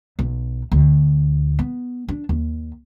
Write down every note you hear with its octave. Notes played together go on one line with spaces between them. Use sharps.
B1
D2
B3
D4
D#2